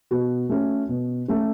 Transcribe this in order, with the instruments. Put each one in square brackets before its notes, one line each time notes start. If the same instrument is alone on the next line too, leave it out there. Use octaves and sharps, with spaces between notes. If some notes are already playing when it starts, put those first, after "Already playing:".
[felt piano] B2 F#4
A3 C#4
B2
A3 C#4